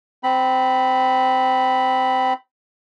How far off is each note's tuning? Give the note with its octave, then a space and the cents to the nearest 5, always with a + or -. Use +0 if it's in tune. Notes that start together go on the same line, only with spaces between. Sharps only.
C4 -15 B5 +0